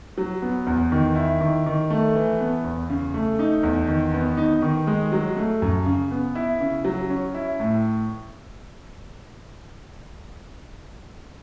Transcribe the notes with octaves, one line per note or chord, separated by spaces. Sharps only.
F#3
B3
E2
D#3
E4
D#3
D#3
A3
E3
B3
E2
C#3
A3
D#4
E2
D#3
B3
D#4
D#3
G#3
F#3
A3
F#2
C#3
B3
E4
C#3
F#3
C#4
E4
A2